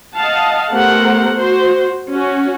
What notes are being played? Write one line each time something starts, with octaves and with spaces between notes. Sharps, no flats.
D#5 F5 F#5 A5
A3 B3 G4 A#4 C5 F#5
F#4 C5
C#4 F#4